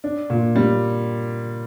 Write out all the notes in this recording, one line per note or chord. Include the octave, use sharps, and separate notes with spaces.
D4
A#2
G3